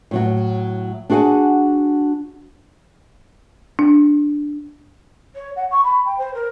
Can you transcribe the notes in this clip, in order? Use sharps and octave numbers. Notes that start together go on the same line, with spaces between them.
A2 F#3 F#4
D4 F#4 G#4 F#5 G#5
D4
C#5
F#5
C#6
B5
G5
C5
A#4